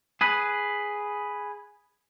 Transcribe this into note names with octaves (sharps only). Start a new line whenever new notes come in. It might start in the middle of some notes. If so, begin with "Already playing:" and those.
G#4 B4